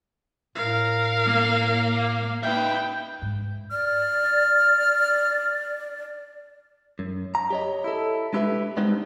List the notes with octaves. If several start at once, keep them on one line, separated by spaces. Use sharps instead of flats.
A2 A#4 F5
A#3
D#4 B4 E5 G5
G#2
D5 F6
F#2
A#5
G4 C#5 D#5
E4 A4
G#3 D4 E4 G4 B4 E5
G3 G#3 B3 C4 D4 D#4